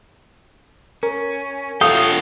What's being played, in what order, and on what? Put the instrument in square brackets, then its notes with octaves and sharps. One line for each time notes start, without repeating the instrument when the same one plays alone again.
[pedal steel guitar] C#4 [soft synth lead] A#4
[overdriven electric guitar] B3 F5 [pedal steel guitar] F4 C#5 G5 [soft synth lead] A4 [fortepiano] D#6